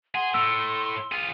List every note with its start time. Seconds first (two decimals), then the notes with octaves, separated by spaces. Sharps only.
0.15 G#4 F#5 C6
0.34 A2 E6
1.12 F4 G#4